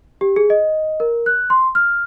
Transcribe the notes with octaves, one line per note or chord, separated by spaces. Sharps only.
G4
G#4
D#5
A#4
F#6
C6
F6